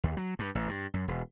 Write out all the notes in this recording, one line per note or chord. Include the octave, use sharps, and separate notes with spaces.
D#2
F#3
G2
A1
G2
F#2
E1